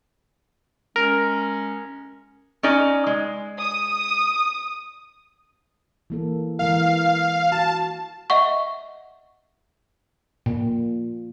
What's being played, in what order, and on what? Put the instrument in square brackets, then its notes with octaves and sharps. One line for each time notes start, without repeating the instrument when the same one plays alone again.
[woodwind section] G#3 C#4 [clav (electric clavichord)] A#4
[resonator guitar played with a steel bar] C#4 D#4 D5
G#3
[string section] D#6
[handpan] E3 A#3 A4
[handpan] E3 G#3 A#4 [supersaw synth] F5
[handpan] F#4 [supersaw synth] A5
[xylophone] D#5 E5 F#5 C#6
[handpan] A#2